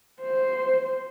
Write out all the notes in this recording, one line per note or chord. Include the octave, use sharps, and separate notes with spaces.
C5